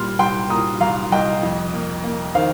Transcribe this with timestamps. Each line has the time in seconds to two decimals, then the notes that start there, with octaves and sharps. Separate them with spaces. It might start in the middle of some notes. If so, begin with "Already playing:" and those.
Already playing: A#2 G3 C6 F6
0.19 C2 G5 C6
0.50 A#2 A#5 D#6
0.81 C2 F5 A#5
1.12 C2 D#5 G5
1.43 F2
1.73 A#3
2.04 A#3
2.35 D#3 C5 F5